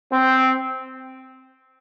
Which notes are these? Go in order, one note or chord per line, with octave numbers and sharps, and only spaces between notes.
C4